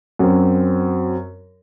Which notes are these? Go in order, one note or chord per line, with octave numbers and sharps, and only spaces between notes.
F#2 F#3 C4